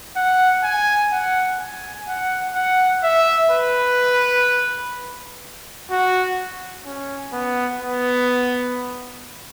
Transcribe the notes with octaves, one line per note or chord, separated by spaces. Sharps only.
F#5
G#5
F#5
G#5
F#5
F#5
E5
B4
F#4
C#4
B3
B3